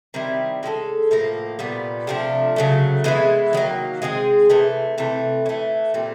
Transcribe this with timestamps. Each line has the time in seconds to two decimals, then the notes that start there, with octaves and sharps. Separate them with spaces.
0.14 D#3 G3 C4 E4
0.63 G#3 C#4 F#4 A4
1.11 A2 F3 A#3
1.59 A#2 G3 B3
2.07 C3 F3 A3 D4
2.56 C#3 F#3 A3
3.04 E3 G#3 B3 E4
3.53 D#3 F#3 A#3
4.02 G#3 C4 F4 G#4
4.50 C3 E3 A3
4.98 C3 E3 A3
5.46 C#4
5.49 E3 A3
5.94 A#2 G3 C4